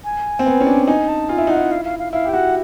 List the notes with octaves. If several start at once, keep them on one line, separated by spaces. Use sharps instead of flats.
G#5
C4
B3
C#4
D4
D#4 G#5
A5
F4 G#5
E4
D#4 F#5
E4
F5
F5
F5
E4 F5
G4
G5
F#4 F#5